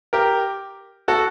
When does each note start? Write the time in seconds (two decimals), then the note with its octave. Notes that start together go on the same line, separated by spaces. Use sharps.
0.13 G4 A#4
1.08 F#4 A4